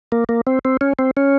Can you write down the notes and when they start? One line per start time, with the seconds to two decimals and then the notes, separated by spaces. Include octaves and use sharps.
0.12 A#3
0.29 A#3
0.47 C4
0.65 C4
0.81 C#4
0.99 C4
1.17 C#4